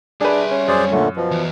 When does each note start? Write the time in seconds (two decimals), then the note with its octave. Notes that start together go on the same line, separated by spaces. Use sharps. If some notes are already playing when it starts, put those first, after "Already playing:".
0.21 G3 D4 G#4 B4 E5
0.51 C#4
0.68 F#2 G#4 C5 D5
0.91 A#2 D3 A3
1.17 B2 F3
1.31 E2